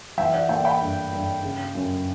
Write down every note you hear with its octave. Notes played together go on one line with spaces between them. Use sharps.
E3 E5 G5
D5 F#5
A#3 E5 G5
G5 B5
G2
G2
C#3
F#2